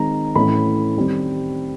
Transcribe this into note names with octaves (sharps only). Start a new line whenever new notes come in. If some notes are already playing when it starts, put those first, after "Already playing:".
Already playing: D#3 G#3 C4 A#5
A2 E3 A3 C#4 B5
D#3 G3 C4